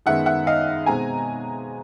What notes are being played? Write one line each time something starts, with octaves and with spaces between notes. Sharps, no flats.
F#2 D#3 G#3 B3 E5 F#5
E5 F#5
D#5 F5
B2 G#3 C4 G#5 A#5